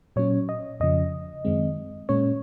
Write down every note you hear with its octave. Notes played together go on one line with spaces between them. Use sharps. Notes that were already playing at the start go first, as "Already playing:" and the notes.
A#2 F#3 C#4 C#5
D#5
F2 C#3 F3 D#5
F#2 D#3 G#3 C4
A#2 G#3 C#4 C#5